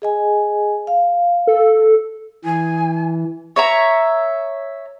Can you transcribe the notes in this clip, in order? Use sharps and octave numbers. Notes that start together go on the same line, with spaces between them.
G#4 D#5 G#5
F5
A4
E3 G#5
C#5 E5 A#5